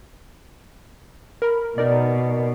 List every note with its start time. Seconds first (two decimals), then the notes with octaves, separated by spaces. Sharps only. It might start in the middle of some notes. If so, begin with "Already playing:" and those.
1.42 A#4 B5
1.78 B2 D#4 A#4 D5